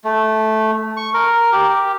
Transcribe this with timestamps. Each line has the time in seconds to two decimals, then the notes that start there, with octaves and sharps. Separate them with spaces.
0.04 A3
0.97 C#6
1.14 A#4
1.52 G4